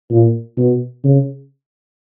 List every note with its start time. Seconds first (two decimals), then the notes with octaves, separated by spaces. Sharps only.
0.10 A#2
0.57 B2
1.04 C#3